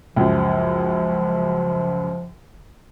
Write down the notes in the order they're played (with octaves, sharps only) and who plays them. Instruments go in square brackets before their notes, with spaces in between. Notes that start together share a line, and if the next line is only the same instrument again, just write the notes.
[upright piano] C#2 F#2 [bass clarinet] F3